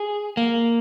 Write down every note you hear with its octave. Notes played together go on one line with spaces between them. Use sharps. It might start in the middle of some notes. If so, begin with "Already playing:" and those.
Already playing: G#4
A#3